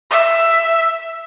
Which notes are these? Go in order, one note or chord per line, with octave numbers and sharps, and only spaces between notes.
E5